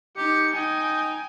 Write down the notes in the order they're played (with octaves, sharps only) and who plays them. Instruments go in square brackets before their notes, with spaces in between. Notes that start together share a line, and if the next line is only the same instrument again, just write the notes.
[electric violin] D#4 C#7 [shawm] G4
[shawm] D#4 [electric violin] G5 G#5